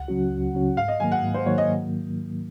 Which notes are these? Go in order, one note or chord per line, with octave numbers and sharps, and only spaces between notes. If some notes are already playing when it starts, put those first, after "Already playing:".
Already playing: C#2 F#5
C#3 F#3 C#4 F#4
C#2
C#3 F#3 C#4 F#4
G#2 F5
D#5
D#3 F#3 A#3 G#5
F#5
G#2
C5
D#3 F#3 A#3 C#5
D#5